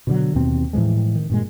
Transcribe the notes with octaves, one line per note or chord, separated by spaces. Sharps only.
B2 D3 F#3
D#2 B2 C4
A2 E3 F3 G#3
D#3
G2 A#2 G#3